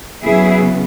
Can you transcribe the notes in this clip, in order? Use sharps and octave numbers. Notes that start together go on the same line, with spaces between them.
C#3 F#3 B3 E4 G#4